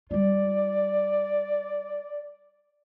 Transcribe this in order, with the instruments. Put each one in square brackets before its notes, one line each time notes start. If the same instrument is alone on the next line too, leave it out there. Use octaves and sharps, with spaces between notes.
[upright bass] G3 F4 [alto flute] D5